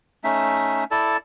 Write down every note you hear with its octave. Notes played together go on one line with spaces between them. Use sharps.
A3 C#4 D#4 E5
E4 A4 D5 A5